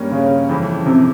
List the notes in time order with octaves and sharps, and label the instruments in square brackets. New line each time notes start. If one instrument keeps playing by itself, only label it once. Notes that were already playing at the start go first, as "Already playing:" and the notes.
Already playing: [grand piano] G2 G3 A#3 C#4
[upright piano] C#3
[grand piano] F2 C#3 E3
[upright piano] C3